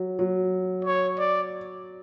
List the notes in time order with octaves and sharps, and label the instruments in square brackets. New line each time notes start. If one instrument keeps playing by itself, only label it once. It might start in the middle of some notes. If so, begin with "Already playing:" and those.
Already playing: [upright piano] F#3
F#3
[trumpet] C#5
D5